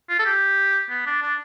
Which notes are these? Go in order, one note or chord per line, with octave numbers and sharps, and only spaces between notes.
F4
A4
G4
B3
D4
D4